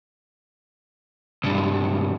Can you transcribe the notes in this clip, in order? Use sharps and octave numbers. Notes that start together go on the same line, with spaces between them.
B1 G2